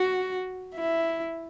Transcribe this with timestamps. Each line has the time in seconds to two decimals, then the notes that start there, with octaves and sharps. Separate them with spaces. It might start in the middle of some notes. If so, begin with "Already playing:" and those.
Already playing: F#4
0.76 E4